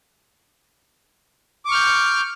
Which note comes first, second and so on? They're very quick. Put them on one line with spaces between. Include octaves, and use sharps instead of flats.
D6 C#6 F6 G6